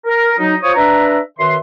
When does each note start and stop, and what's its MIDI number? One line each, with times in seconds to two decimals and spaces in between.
0.05 0.33 70
0.38 0.55 54
0.38 0.55 63
0.62 0.75 65
0.62 0.75 72
0.62 0.75 73
0.62 0.75 87
0.76 1.19 62
0.76 1.19 71
0.76 1.19 76
0.76 1.19 82
1.38 1.56 42
1.38 1.56 51
1.38 1.56 71
1.38 1.56 76
1.38 1.56 84